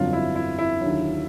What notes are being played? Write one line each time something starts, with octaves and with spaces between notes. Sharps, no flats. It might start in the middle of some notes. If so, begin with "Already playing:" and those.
Already playing: G1 F2 D3 F#3 F4
E4
E4
E4
D#2 D3 F#3